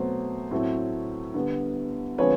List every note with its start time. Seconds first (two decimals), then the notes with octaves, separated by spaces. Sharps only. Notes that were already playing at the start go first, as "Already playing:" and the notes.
Already playing: B2 F#3 A3 C4 C5
0.51 A2 F#3 A3 C4
1.34 D3 G3 B3
2.18 D3 F3 G#3 C4 B4 C#5